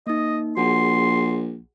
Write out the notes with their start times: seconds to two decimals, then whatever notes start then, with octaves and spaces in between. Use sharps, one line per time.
0.07 A#3 D#4 D#5
0.57 A#1 F#4 G#4 F#5 C6